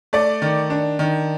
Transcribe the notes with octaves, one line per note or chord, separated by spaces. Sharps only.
A3 D5
D#3
D4
D#3